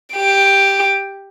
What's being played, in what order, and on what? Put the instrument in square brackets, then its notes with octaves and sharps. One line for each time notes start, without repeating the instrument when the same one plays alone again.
[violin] G4 D7